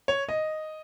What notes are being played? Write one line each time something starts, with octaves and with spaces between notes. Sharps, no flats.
C#5
D#5